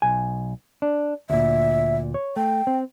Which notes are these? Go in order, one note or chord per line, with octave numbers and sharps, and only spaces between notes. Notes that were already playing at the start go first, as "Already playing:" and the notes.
B1 G#5
D4
D2 A#2 E5
C#5
A3 G5
C4